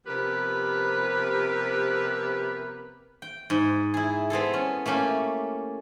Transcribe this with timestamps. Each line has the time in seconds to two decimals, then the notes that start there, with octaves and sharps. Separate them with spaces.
0.07 C3 F3 B3 G4 A#4 B4
3.22 G5
3.50 G#2
3.94 E4 G#4
4.30 B3 C4 G#4 A4
4.53 C#4
4.86 A3 A#3 C#4 G4